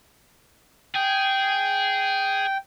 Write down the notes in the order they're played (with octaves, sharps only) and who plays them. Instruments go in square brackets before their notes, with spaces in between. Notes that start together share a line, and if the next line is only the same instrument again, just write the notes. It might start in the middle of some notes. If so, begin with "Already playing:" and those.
[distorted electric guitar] G#4 [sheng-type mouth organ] G5